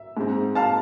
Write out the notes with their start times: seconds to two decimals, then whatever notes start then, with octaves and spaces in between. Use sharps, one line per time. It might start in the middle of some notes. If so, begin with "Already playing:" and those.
Already playing: E5
0.17 G#2 G#3 C4
0.55 F5 A5